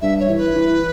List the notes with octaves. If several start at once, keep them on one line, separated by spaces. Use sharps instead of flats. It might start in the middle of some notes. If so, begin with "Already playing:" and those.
G2 E5
C#5
E3
B4
E3